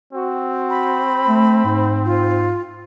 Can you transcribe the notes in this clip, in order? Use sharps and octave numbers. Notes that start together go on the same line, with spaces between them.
C4 F#4
B5
A3
G#2
F4